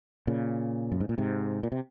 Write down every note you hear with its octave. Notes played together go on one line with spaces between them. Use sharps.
A#2 C#3
F#2
G#2
A#2
G#2 C3
A#2
C3